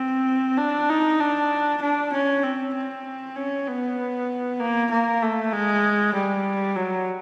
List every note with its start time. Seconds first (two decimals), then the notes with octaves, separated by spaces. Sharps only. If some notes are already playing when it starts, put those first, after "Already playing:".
Already playing: C4
0.58 D4
0.90 D#4
1.20 D4
1.82 D4
2.13 C#4
2.43 C4
2.74 C4
3.36 C#4
3.67 B3
4.60 A#3
4.91 A#3
5.22 A3
5.52 G#3
6.15 G3
6.76 F#3